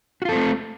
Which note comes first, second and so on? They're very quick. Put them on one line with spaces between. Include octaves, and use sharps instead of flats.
F#4 F4 A4 C4 A3